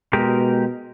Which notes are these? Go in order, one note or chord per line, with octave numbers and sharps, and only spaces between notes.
B2 G#3 G4 A#4